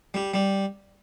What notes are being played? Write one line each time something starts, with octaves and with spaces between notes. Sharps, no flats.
G3
G3